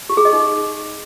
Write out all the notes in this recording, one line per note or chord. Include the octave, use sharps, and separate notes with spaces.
G4
G#4
D#5
D#4